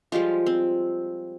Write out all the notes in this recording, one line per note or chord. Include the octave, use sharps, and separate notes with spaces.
F3 G3 G#3 F4
C4